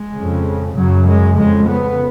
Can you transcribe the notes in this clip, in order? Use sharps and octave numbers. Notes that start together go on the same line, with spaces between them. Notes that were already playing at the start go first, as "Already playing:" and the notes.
Already playing: G#3
F2 C#3
F#2 C#3 F#3
G#3
F2 C#3 G#3
B3